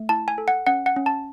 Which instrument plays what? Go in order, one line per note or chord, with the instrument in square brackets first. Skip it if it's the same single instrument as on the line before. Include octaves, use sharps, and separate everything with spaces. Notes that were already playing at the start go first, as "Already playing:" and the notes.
Already playing: [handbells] A3
E4 A5
G#5
A4
F#5
C#4 F#5
F#5
C#4
A5